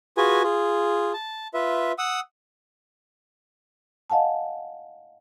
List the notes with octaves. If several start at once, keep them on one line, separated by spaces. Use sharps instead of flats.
F4 F#4 G#4 B4 G#5
F4 G#4
A5
F4 B4 E5
F#5 D#6 E6
D#5 F5 F#5 G#5 A5